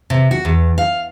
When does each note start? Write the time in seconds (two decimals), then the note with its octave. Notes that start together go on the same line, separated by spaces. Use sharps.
0.10 C3
0.31 F#4
0.45 E2
0.78 F5